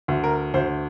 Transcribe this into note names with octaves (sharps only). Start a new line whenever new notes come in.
D2
A#4
D2 C5